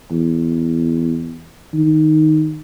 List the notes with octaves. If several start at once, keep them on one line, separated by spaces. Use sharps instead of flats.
E2
D#3